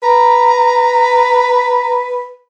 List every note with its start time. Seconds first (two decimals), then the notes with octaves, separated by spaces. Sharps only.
0.03 B4 A#5